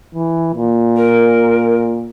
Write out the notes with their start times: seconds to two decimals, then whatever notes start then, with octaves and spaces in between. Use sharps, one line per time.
0.15 E3
0.55 A#2
0.97 A#4